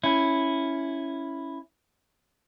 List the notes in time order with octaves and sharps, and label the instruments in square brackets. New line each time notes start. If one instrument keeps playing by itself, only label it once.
[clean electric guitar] C#4 E4